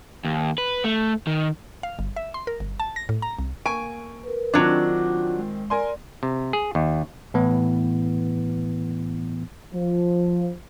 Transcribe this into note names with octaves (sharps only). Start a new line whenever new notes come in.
D#2
B4
A3
D#3
F5
G1
E5
C6
A#4
G1
A5
A#6
A2
A#5
C2
A#3 G#5 C#6 D7
A#4 B4
D#3 F#3 C4 D4 F4
G#3
A#4 D5 G#5 C6
C3
G#4
D#2
A2 E3 B3
F3